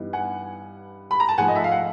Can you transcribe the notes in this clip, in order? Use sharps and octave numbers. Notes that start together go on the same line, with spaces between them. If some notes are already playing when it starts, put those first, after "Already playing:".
Already playing: G2 E3 G3 B3 D#4
F#5 G#5
B5
A#5
A5
G#2 F3 A3 F#5 G#5
D#5
E5
F5
F#5